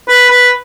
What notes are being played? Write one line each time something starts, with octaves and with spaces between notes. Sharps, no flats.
B4
B4